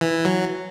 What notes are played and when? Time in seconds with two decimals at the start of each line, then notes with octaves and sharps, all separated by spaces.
0.01 E3
0.25 F#3